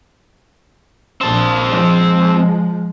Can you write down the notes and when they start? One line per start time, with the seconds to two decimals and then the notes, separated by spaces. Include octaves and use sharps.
1.21 A#1 C4 A5
1.68 F3 G#3